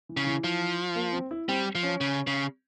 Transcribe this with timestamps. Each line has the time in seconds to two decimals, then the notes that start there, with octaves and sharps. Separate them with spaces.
0.09 E3
0.17 C#3
0.27 E3
0.44 F3
0.95 A#3
1.13 C4
1.31 E4
1.48 G3 C4
1.75 F3
1.83 C#4
2.01 C#3
2.27 C#3